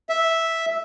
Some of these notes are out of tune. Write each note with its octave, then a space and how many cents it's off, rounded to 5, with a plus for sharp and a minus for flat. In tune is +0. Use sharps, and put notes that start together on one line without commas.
E5 -5